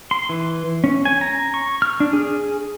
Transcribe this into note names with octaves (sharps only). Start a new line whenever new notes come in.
C6
E3
C#4
G#5
A#5
C#6
F6
D4
G#4